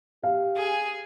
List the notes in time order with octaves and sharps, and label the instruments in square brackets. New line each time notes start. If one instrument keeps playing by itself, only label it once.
[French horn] G4 [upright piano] F5
[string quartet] G#4 [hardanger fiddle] G#5